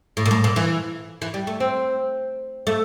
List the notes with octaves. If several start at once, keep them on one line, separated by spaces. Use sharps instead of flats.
A2
A#2
A2
A#2
E3
E3
G3
A3
C4
A3